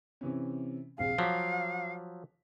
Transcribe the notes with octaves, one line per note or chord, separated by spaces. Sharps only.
C3 E3 C#4
A#1 C3 G#4 F5
F3 F#3 D6 F6 B6